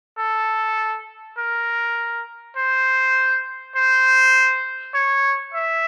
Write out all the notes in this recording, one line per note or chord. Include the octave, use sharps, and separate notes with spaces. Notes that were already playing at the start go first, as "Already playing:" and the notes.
A4
A#4
C5
C5
C#5
E5